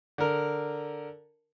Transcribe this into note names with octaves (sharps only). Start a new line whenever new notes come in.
D3 A#4